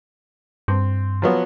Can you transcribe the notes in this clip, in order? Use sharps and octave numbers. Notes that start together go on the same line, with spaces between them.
G2 C4
F3 F#3 B3